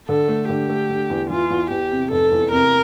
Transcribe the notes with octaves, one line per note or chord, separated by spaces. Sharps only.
D3 A4
A3
D3 G4
A3
D3
E2
E3 F4
E2
E2 G4
C3
F1 A4
E2
C3 A#4